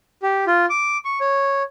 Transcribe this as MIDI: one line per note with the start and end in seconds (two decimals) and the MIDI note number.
0.23 0.45 67
0.47 0.66 65
0.70 0.97 86
1.05 1.19 85
1.21 1.63 73